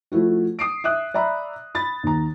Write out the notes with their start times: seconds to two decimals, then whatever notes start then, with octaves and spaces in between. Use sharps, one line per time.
0.12 F3 A3 E4 F#4
0.59 D#6 C7 D7
0.84 E5 D#6 F#6
1.14 D5 E5 A#5 B5
1.75 B5 A6
2.03 D#2 A#5